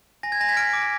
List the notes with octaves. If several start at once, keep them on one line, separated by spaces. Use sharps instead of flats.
G#5 A#6
G#6
G#5 A#6
G#6 B6
F6 A#6 D7
D6